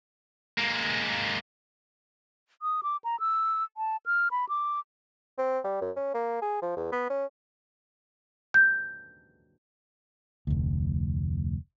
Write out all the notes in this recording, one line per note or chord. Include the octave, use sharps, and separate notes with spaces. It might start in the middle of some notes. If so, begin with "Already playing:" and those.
G#3 A#3
D#6
D6
A#5
E6
A5
F6
B5
D6
C4
G3
F#2
C#4
A#3
G#4
F3
E2
B3
C#4
G6
F1 D2